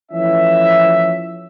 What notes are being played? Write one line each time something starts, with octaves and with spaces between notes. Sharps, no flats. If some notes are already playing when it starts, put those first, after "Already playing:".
E3 F3 A3 C#4 E5